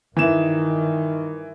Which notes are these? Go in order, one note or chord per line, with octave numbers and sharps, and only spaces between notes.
G2 D#3 E3 E7